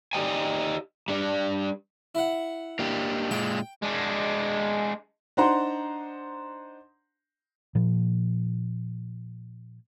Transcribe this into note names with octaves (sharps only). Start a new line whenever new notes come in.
D#4 G4 D5 D#5 G5 G#5
G3 D4
E4 F#5
A#3 D4 G4
A#2 G#3 G5
G#3 D4
D4 D#4 C5 F#5 A#5 C6
A#2 F3